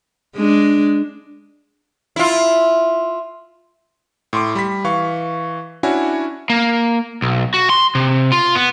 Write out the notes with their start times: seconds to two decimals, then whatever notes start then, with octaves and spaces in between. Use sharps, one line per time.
0.36 G#3 D4
2.16 E4 F4
4.33 A2 C6 D6
4.55 G3 B5 B6
4.84 E3 F5 C#6
5.83 C#4 D4 E4 F#4 C#5 G#5
6.50 A#3
7.22 B1
7.54 F#4
7.70 C6
7.95 C3
8.32 F4
8.55 B3